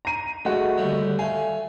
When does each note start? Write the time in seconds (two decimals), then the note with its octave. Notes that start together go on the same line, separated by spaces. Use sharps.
0.05 A#5 D#7
0.45 G#3 A3 F#4
0.78 D#2 D3 G3
1.19 A3 F5 G#5